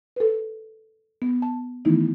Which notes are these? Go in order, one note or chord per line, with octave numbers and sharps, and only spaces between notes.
A4 B4
B3
A5
D#3 E3 A3 B3 D#4 E4